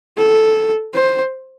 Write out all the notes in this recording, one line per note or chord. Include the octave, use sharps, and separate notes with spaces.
A4
C5